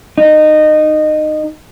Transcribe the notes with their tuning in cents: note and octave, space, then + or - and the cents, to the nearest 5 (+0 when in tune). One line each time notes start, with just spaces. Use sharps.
D#4 -20